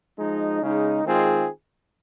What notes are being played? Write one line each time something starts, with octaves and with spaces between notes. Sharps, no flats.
F3 G#3 D#4
C#3 G#3 D#4
D#3 G#3 C4 F4 G#4